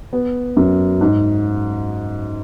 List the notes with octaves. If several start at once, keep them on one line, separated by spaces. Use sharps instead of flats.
B3
F#2
G#2